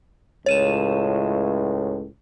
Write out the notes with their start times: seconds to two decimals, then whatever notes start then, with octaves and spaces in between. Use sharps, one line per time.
0.46 C#2 A2 C#5 D#7 E7